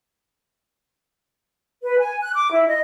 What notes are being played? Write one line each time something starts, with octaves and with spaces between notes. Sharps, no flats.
B4
G#5
F#6
D6
E4
D#5